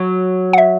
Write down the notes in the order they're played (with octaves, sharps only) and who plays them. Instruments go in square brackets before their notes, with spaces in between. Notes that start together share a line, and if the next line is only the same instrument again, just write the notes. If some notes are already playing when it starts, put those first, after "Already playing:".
Already playing: [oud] F#3
[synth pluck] F#5
E5